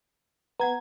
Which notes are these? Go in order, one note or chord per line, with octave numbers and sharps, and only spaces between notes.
B3 F#5 A#5 G#6